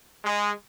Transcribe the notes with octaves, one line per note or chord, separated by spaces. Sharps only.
G#3